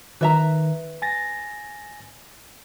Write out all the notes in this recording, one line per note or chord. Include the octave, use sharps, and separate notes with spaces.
D#3 B4 E5 A#5
G#5 A6 A#6